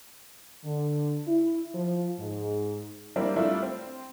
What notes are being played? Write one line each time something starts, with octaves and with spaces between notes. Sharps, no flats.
D3
E4
F3
G#2
G3 A#3 C4 D4 E4
G3 A3 D4 E4 F4
C4